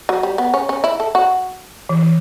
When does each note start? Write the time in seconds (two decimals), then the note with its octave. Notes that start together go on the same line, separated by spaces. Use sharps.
0.09 F#3
0.23 G3
0.38 B3
0.54 C#4
0.69 C#4
0.84 E4
1.00 A4
1.15 F#4
1.89 E3
2.03 E3